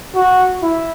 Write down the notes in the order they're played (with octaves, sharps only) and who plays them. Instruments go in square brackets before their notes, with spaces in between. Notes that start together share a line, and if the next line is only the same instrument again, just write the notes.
[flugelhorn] F#4
E4